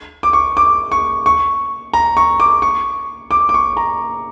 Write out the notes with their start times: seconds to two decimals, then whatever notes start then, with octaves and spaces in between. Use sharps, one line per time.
0.23 D6
0.33 C#6
0.57 D6
0.92 C#6
1.26 C#6
1.93 A#5
2.17 C#6
2.40 D6
2.62 C#6
3.31 D6
3.49 D6
3.54 C#6
3.77 A#5